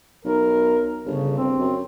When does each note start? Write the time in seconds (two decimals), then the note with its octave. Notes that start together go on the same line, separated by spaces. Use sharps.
0.25 B1 A#4
1.06 G1 C#3
1.38 C4
1.60 F#2